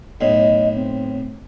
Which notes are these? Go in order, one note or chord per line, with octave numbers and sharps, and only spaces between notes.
B1 A2 D#5
C4